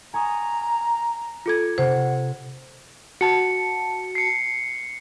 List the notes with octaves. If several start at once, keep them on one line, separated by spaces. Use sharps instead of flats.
G#5 A#5 C#6 D#6
F4 A4 G#6 C#7
C3 C5 F#5
F#4 A5 C#7
C7 C#7